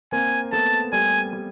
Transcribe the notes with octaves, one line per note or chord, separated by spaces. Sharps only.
A#3 C4 G#5
A3 B3 A5
G3 A3 G#5
G3